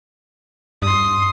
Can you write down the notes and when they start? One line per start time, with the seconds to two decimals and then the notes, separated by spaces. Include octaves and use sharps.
0.82 G2 C6 D#6